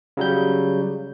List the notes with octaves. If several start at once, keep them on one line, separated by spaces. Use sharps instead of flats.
C#3 F#3 G3 G6